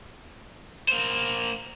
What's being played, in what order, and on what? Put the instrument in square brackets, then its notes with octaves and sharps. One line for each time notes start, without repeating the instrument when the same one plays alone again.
[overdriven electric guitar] A#3 C5